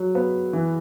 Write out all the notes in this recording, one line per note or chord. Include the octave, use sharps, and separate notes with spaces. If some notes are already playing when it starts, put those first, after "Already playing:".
Already playing: F#3
B3
E3